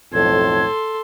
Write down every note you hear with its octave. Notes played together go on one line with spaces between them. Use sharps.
B1 F2 A2 A4 C6 G#6